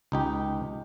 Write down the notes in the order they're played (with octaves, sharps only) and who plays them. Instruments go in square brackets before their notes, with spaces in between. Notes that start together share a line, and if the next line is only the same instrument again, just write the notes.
[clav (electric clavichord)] C#2 D#4 G4